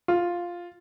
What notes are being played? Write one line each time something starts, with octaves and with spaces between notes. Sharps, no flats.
F4